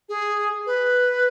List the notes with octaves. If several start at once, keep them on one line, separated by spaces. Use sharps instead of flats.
G#4
B4